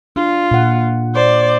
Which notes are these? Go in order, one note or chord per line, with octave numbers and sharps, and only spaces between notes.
D4 F4
A#2 F#5
C5 D5